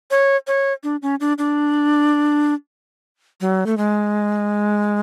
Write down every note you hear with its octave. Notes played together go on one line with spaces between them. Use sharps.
C#5
C#5
D4
C#4
D4
D4
F#3
A3
G#3